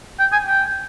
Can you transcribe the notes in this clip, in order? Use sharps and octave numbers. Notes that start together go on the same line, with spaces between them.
G5
G#5
G5